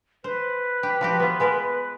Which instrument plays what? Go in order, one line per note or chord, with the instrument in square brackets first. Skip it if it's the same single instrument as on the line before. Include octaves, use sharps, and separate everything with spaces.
[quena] B4 [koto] C5
[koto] G4
F3 F#4 G4
B3 F4
G#3 B3 A#4